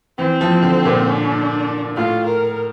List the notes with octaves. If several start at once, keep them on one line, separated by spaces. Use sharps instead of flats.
E3 C4
F3
D3
A#2
D4
A2 F4
A#4